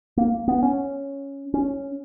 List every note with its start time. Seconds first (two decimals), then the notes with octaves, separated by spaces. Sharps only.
0.17 A#3
0.48 B3
0.63 C#4
1.54 C#4